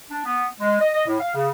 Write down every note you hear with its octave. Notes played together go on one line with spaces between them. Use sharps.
D4
B3
G#3
D#5
D#5
A2
F5
C#3